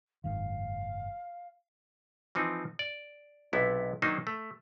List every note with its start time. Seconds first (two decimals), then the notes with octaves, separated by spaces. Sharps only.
0.24 F#1 G#2 D#3 F5
2.35 E3 F3 C4 D#4
2.79 D5
3.53 B1 C3 B3 E4
4.02 D#3 F#3 A#3 D4 D#4 C5
4.27 A3